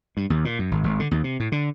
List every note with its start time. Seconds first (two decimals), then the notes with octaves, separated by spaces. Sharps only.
0.17 G2
0.30 D#2
0.45 A#2
0.59 F#2
0.71 G#1
0.84 G#1
1.00 D3
1.11 D#2
1.24 C3
1.40 A2
1.52 D3